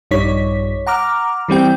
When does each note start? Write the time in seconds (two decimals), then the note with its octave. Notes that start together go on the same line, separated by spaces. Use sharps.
0.11 A#1 G2 G3 D#4 C#5 B6
0.87 F#5 A#5 D6 F6
1.49 E3 G3 C4 G5